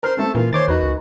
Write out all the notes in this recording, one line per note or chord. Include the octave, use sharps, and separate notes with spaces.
A#4 C5 F6
A3 C4 A4
A#2 E3 A#3 F4
D#3 C5 C#5 D6 A6
E2 D#4 F#4 B4
C#2